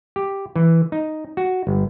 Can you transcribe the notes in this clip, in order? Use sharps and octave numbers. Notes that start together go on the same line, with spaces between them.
G4
E3
D#4
F#4
G1